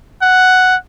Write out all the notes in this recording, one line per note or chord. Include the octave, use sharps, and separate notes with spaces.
F#5